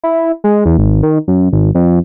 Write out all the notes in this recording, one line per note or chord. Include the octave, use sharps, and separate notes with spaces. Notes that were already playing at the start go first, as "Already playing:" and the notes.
E4
G#3
E2
G#1
D#3
F#2
G#1
F2